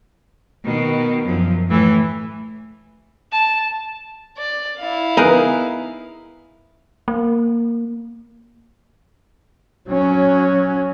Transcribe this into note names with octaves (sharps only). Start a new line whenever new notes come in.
B2 D#3
F#2 F3
A2 E3
A5
D5
E4 F5
B3 D#4 G#4 A#4 F#6
A#3
F#3 C#4